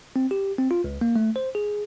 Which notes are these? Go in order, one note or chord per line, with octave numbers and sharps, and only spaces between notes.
C4
G4
C4
F4
C#2
A#3
A3
C5
G#4